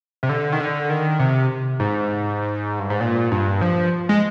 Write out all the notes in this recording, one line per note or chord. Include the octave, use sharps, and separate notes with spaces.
C3
D3
D#3
D3
D#3
C3
G#2
G2
G#2
A#2
G2
F3
G#3